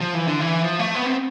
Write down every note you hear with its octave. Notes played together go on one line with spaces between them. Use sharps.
F3
E3
D3
E3
F3
A3
B3
C4